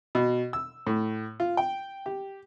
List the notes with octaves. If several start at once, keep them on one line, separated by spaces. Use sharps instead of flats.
B2
E6
A2
F4
G5
G4